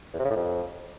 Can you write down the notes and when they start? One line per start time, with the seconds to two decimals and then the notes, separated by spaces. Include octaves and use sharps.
0.14 E2
0.19 C3
0.25 C#3
0.31 A2
0.36 F2